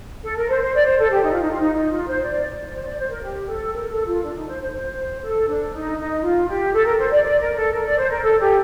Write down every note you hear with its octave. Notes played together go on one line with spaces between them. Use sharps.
A4
A#4
C5
C5
D5
C5
A4
G4
D#4
F4
D#4
F4
D#4
D#4
F4
C5
D5
C5
D5
C5
A#4
G4
A4
A#4
A4
F4
D4
D#4
C5
C5
C5
A4
D4
D#4
D#4
F4
G4
A4
A#4
C5
D5
D5
A#4
A4
A#4
D5
C5
A#4
A4
G4